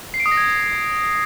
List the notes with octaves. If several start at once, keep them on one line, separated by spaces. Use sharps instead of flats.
C7
D7
D#6
A#6
G#6